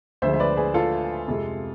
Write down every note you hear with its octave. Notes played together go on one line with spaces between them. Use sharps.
D2 D3 F3 G#3 C5 E5
E5
B4 D5
G#4 B4
F4 A4
F2 C3 G#3